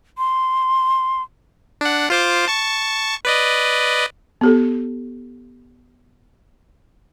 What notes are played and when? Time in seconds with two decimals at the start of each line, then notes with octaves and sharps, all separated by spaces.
0.18 C6
1.81 D4 F#5
2.10 F4 C5 D6
2.48 A5 C#6
3.25 B4 D5 D#5
4.41 B3 G4 A4